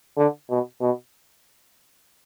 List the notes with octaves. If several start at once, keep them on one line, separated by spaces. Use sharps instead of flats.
D3
B2
B2